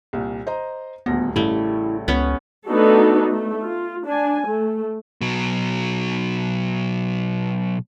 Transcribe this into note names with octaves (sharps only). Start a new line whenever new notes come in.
C2 A#2
C5 D#5 A#5
D#1 D2 B3 A#6
A1 C#3 G3 A3 E4
C#2 B3 C#4
A3 B3 D4 D#4 F#4 A4
A3
F4
D4 G#5
A3
B2 F#3